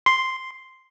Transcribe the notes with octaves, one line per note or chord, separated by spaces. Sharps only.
C6